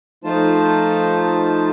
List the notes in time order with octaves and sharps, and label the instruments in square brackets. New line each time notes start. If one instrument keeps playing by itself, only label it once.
[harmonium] F3 A3 D#4 F4 C5 A5